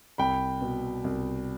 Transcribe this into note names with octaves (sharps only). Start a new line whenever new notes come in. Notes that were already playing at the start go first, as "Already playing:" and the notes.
C2 G5 B5
B2
C2